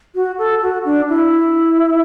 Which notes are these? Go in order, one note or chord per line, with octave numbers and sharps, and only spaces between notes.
F#4
A4
F#4
D4
E4